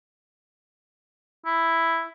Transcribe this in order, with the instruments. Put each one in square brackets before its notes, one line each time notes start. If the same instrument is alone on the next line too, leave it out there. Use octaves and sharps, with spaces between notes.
[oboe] E4